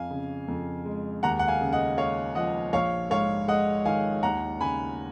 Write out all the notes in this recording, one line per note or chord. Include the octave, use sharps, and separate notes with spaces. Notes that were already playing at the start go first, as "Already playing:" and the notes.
Already playing: F2 F5 G#5
C#3
F2
G#3
D#2 F#5 A#5
F#5
F5 G#5
C#3
D#5 F#5
G#3 C#5 F5
F3 D#5 F#5
A#1 C#5 F5
G#2 C#5 F5
G#3 D#5 F#5
D#3 F5 G#5
D#2 F#5 A#5
C#3 G#5 B5